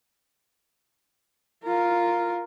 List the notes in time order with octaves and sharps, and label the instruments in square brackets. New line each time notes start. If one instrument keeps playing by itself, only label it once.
[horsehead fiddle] F4 A#4